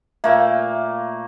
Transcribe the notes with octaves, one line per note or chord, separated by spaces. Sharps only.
A#2 A3 A#3 E5 F5